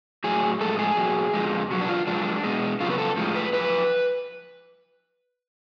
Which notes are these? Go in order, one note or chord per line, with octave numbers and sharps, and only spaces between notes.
A2 F#3 G#4
A2 F3 G#3 A4
G#4
B2 F#3
F2 D3 F3 G#3
B2 F#3 F#4
D4
F4
F#2 F3 G#3 D4
B2 G#3
F#2 C#3 F3 F4
B4
A4
A2 F3 G#3
B4
F#2 F3 B4